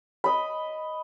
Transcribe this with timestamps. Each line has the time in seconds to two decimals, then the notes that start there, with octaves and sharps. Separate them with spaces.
0.24 D#5 B5